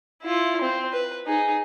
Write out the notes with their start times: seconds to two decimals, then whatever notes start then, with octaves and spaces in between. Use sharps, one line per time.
0.22 E4 F4
0.61 C4
0.93 B4
1.27 D#4 G#4